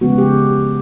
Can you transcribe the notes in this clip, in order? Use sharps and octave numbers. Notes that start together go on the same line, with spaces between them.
C#3 F3 G#3 B3 F#4
G4